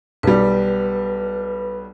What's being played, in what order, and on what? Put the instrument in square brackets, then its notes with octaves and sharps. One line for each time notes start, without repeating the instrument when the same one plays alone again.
[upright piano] B1 G3 [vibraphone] B4